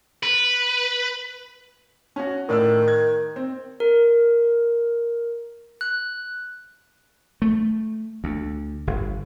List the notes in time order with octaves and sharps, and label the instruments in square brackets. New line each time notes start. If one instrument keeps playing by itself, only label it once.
[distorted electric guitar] B4
[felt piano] C#4 F#4
[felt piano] A2 D5 E6 [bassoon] D#3
[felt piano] G#6
C4
[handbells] A#4
F#6
[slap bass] A3
D2
G1